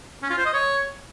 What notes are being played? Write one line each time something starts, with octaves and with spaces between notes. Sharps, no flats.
C#4
F4
C5
D#5
C#5